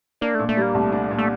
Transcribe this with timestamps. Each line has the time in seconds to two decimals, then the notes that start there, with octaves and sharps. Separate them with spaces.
0.21 A#3 D4
0.35 A#2 A3
0.49 A3
0.57 G3 A#3
0.74 C2 A3
0.92 D4
1.11 A#2
1.18 A3